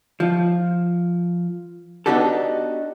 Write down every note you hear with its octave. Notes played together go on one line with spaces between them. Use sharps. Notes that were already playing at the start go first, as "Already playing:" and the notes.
F3
B3 D4 D#4 F#4 G4 A4